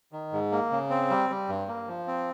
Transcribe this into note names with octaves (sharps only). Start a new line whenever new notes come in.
D#3
G#2
A#3
C#3
C4
G3
G3
G2
A#3
F3
C4